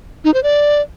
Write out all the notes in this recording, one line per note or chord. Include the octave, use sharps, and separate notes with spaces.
D#4
C5
D5